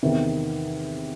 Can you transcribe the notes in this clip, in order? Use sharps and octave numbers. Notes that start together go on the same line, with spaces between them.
E2 C3 D#3